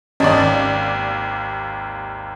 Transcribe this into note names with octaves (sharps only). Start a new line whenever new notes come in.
G#1 D#2 C#4 D5 D#5 A5